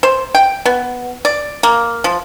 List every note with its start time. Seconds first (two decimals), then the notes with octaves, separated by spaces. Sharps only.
0.03 C5
0.35 G5
0.65 B3
1.25 D5
1.63 A#3
2.04 F3